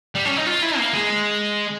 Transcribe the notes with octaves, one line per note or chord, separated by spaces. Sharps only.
G3
C#4
D#4
F4
E4
A#3
G#3